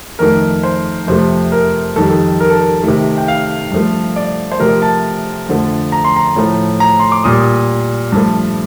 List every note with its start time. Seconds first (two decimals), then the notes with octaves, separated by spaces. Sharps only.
0.19 F2 D#3 A3 A#4
0.63 C5
1.07 F2 C3 F3 A3 C5
1.52 A#4
1.96 F2 D#3 G3 A4
2.10 A4
2.40 A#4
2.50 A4
2.61 A#4
2.84 C3 D#3 A3
3.18 G5
3.28 F5
3.71 G2 F3 A3
4.16 D5
4.52 C5
4.60 C3 F3 A3 A#4
4.82 A5
5.49 F2 D3 F3 A3
5.92 A#5
6.04 C6
6.16 A#5
6.36 A2 F3 A3
6.80 A#5
6.99 C6
7.12 D6
7.24 A#2 G3 D#6
8.12 G2 F3 A3